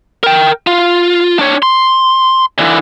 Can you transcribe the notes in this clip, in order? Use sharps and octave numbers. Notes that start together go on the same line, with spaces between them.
A#4 G5
F4
D4 C#5
C6
D3 E3